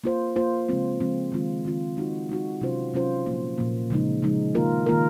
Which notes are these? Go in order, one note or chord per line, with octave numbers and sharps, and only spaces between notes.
A#3 F4 C5
A#3 F4 C5
C#3 F3 G#3 C4 F4
C#3 F3 G#3 C4 F4
D#3 G#3 C4 F4
D#3 G#3 C4 F4
G#3 D#4 F#4
G#3 D#4 F#4
C3 F#3 C#4 F4 C5
C3 F#3 C#4 F4 C5
A#2 F3 A#3
A#2 F3 A#3
C#3 F3 G#3 D#4
C#3 F3 G#3 D#4
D#3 A#3 F4 A#4
D#3 A#3 F4 A#4